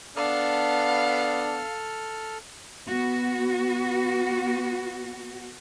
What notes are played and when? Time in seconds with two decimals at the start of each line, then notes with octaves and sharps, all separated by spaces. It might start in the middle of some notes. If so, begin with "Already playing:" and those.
0.16 B3 D4 A4 F5 F6
2.87 B3 F#4